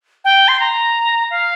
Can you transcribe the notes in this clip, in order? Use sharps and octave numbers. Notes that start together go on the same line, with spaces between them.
G5
C6
A#5
F5